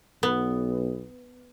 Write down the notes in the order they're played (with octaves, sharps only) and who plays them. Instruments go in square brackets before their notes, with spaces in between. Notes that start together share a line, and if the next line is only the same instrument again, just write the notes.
[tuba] B1 [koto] B3